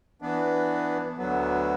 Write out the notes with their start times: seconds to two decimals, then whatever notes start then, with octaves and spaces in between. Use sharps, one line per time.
0.22 E3 B3 D4
1.18 D2 D3 F#3 B3